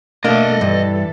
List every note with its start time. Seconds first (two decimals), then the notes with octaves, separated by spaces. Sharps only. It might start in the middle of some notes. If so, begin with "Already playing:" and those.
0.25 B2 A3 A#3 D4 A4 D#5 E5
0.61 G2 E3 A4